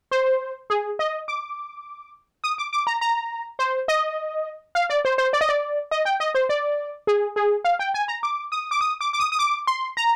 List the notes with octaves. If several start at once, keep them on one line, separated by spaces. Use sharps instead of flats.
C5
G#4
D#5
D6
D#6
D6
D6
A#5
A#5
C5
D#5
F5
D5
C5
C5
D5
D#5
D5
D#5
G5
D#5
C5
D5
G#4
G#4
F5
G5
G#5
A#5
D6
D#6
D6
D#6
D6
D6
D#6
D#6
D6
C6
A#5